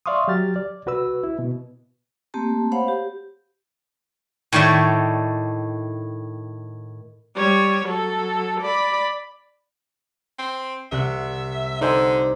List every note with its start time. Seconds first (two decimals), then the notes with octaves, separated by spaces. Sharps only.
0.06 D5 E5 F5 C6 C#6 D#6
0.28 F#3 G4 F6 A6
0.56 D5
0.86 C2 F#4 B4 E6
1.23 E4
1.39 B2
2.34 A3 A#3 C4 G4 A5
2.72 C5 C#5 F5 F#5 B5
2.88 G4
4.52 A2 D#3 C#5 D5 E5
7.35 G3 C#5
7.85 F#3 A4
8.61 D5 B5
10.39 C4
10.92 C2 E5 F#5
11.81 D3 D#4 C5 D5 G#5 E6